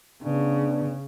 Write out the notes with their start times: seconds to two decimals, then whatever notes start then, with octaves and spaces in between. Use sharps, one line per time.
0.23 C#3 B3 D4